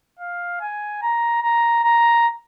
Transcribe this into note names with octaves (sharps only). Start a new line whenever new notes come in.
F5
G#5
A#5
A#5
A#5